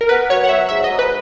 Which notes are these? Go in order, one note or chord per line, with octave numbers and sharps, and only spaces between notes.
A#4
B3 B4
F#3 C#5
F#5
F#3 E5
G#2 E5
D#5
G#2
B4